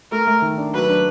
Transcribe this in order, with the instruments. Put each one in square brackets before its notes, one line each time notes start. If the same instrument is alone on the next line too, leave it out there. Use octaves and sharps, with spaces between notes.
[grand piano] A3 [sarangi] A#4
[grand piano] A3
D#3
D4
[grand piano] F#3 [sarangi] B4
[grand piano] D4